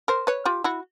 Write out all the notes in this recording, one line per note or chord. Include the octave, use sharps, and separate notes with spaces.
A#4 C5
B4 C#5
F4 G4
E4 F#4